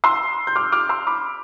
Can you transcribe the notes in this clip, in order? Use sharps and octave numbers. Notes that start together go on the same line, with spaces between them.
C6 E6
G6
D6 F6
D6 F6
C6 E6
B5 D6